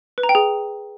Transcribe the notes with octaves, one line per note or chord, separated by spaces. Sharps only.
B4
A#5
G5
G#4